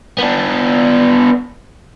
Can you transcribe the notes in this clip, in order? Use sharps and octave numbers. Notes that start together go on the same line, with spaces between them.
B3 D4